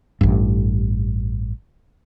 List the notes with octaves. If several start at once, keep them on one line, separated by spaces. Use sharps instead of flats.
A1 G2